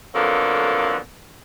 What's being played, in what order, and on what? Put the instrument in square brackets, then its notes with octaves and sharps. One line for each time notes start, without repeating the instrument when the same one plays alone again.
[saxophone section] F2 D3 F#3 A#3 B3 A4